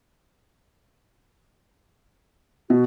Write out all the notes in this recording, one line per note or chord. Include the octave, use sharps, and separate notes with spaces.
B2 F#4